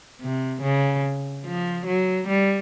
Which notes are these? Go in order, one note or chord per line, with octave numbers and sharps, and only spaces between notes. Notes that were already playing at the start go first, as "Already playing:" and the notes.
C3
C#3
F3
F#3
G3